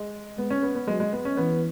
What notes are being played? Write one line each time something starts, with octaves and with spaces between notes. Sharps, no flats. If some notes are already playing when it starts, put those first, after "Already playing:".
Already playing: G#3
G#3 B3
C#4
B3
B3
F#3 G#3
G#3
B3
C#4
E3 B3